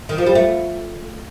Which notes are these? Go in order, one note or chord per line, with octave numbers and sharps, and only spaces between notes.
D#3
F3
G3
A3